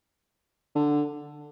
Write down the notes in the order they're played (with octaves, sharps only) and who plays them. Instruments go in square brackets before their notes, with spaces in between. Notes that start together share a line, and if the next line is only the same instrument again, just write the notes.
[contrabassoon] D3